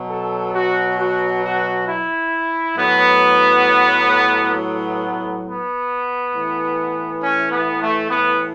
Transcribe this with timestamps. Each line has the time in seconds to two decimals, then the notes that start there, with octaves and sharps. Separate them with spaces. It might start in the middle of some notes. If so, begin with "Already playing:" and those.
Already playing: B2 F#3
0.10 A4
0.54 F#4
0.99 F#4
1.43 F#4
1.87 E4
2.77 A2 F#3 B3
4.54 B3
5.43 B3
6.33 A2 E3
7.21 C#4
7.51 B3
7.80 A3
8.10 B3